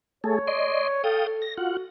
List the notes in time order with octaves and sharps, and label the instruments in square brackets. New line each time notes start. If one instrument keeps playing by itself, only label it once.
[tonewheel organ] A3 G#4 A4 [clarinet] C#5
[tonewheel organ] D5 D#5 C6
[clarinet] A4 [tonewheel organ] F5 G5 D#6
[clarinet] A4
[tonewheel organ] A#6
[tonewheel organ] F4 F#5 [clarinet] F#4